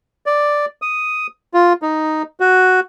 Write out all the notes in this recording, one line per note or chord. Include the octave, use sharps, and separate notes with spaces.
D5
D#6
F4
D#4
F#4